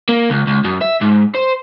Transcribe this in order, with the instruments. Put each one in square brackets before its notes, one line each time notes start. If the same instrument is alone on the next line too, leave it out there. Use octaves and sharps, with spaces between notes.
[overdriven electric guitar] A#3
C#2
C#2
F#2
E5
G#2
C5